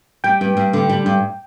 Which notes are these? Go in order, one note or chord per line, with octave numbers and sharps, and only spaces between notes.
G3 G5
G2
G2
D3
G3
G2